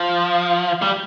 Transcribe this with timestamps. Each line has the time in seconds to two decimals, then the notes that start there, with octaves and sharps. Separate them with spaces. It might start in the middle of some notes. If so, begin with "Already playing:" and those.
Already playing: F3
0.82 G3